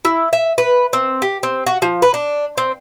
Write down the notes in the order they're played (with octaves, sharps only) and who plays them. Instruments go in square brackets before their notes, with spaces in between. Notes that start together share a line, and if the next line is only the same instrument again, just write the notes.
[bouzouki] E4
E5
B4
C4
G4
C4
F#4
F3
B4
D4
C4